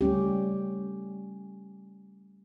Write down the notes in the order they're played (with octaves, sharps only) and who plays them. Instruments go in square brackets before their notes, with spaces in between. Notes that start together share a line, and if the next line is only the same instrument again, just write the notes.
[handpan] G3 A3 C#4 G4